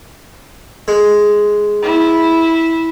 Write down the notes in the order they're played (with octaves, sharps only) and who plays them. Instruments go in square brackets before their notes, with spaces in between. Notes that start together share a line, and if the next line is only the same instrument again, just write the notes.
[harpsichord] G#3
[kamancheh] E4